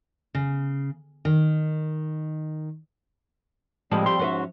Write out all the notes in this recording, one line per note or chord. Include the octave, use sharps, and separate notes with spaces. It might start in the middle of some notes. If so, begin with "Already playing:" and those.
C#3
D#3
A2 F3 G3 G#3 C4 G4
G4 C6
G#2 C#4 F#4 B4 E5